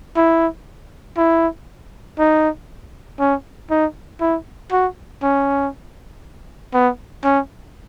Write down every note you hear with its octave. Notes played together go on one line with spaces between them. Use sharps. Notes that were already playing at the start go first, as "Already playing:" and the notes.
E4
E4
D#4
C#4
D#4
E4
F#4
C#4
B3
C#4